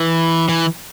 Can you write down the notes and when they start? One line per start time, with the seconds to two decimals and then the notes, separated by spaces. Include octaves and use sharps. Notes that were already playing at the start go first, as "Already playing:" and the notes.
Already playing: E3
0.49 E3